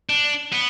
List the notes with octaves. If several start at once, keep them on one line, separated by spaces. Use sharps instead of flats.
D4
B3